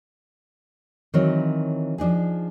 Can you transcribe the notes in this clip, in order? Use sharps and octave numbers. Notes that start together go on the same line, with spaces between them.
D#3 E3 F#3 C4 A#4 C#5
F3 D4 D#4 G#4